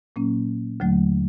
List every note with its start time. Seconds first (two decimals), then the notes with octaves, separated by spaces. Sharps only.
0.16 A#2 F#3 A#3 C#4
0.80 D#2 D3 F#3 A3